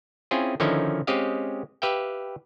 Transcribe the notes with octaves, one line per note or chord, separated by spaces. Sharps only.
C4 C#4 E4 F4 G#4
D3 D#3 F3 C#4 D#4 E4
G#3 C4 C#4 G4 D#5 F5
G4 B4 E5 F5 G5